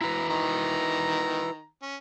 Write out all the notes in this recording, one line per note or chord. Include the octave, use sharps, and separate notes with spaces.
E4 F#4 B4 A#5
D#3 A#5
C#4